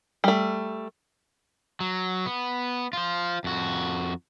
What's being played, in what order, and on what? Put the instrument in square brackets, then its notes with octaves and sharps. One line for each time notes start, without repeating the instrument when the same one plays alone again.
[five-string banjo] G3 A3
[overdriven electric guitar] F#3
B3
F4 C5
F2 F#4